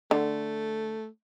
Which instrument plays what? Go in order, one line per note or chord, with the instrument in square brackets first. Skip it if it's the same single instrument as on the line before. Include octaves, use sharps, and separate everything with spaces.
[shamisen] D3 [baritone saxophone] A3